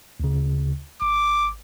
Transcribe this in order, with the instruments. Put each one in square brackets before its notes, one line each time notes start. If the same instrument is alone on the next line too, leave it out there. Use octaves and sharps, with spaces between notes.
[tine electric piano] D2 C#3
[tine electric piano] G#1 [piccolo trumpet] D6